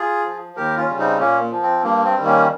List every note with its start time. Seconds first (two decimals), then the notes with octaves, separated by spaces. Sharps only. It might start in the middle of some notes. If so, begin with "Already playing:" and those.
Already playing: F4 G#4
0.25 F3
0.56 D#2 G4 A#4
0.77 C#4 F4
0.88 C#3 G3
0.98 C4 D#4
1.19 A#2 A#3 C#4
1.51 F3
1.63 C4
1.83 G2 A#3
2.05 C4
2.16 D#3 G3
2.25 A#3 C#4